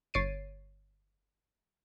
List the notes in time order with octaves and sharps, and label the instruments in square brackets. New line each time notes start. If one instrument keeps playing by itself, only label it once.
[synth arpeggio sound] G1 C#5 A6 C7 D7 D#7